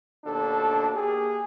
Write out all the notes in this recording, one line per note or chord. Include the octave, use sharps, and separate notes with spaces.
D#2 B2 D4 A4
A#3 G4 G#4